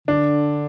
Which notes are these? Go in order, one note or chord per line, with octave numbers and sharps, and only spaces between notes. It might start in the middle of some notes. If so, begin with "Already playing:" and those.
D3 D4